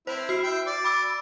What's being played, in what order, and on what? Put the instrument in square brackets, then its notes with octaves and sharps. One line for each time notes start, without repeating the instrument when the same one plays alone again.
[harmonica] C4 E4 [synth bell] C5
[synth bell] F#4 C7
[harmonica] E5 G5
D5
[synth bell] B5 D6 E6